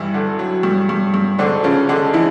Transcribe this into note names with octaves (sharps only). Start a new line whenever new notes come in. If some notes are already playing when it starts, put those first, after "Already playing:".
Already playing: G2 E3 E4
D3
F#3
G2
G2
G2
G#2 D3 D4
C#3 F3 C#4
D3 G#3 D4
E3 G#3 E4